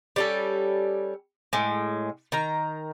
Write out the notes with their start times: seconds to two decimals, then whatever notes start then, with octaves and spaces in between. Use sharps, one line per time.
0.16 G3 C#4 A4
1.53 A2 G#3
2.32 D#3 A#5